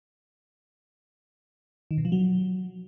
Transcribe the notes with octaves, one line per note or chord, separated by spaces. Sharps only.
D#3
B2
F3
F#3